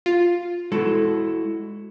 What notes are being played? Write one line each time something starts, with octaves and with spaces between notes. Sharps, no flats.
F4
G#3 E4 F#4 A4